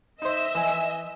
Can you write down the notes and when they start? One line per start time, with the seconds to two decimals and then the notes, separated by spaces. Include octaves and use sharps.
0.22 D#4 C5 D#5 E5 E6
0.55 E3 G#5